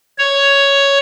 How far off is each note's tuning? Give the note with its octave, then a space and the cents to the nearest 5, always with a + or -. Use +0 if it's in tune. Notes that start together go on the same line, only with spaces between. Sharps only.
C#5 +5